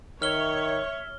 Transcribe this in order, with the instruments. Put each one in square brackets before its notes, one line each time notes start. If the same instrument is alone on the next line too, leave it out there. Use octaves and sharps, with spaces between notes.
[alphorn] D#3 [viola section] C#5 [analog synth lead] E5 [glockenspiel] F6 G7